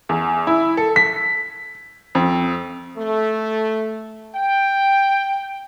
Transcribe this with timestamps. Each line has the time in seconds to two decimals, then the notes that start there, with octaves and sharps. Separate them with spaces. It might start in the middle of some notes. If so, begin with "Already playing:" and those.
0.09 E2
0.47 E4
0.77 A4
0.96 B6
2.15 F2
2.98 A3
4.36 G5